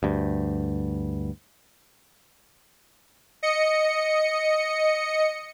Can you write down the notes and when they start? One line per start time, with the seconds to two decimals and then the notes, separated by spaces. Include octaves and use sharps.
0.03 D2 G2
3.43 D#5 C#7